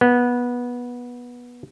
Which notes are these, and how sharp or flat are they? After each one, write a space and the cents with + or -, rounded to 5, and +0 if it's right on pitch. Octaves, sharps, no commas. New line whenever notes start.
B3 -15